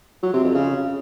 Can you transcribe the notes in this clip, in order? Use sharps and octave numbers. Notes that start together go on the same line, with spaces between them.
F#3
C3
F2
C#3